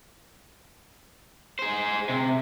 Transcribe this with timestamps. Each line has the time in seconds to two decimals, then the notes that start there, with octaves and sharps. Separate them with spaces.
1.59 G#4 C5
2.09 C3